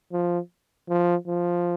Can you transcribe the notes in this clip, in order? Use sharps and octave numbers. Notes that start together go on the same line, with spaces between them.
F3
F3
F3